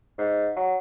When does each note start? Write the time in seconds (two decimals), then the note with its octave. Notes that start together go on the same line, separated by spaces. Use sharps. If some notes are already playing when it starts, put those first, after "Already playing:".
0.18 G#2
0.56 F#3